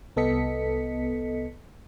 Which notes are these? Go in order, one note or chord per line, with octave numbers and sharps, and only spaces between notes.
C2 B3 A4 D#5 B6 C#7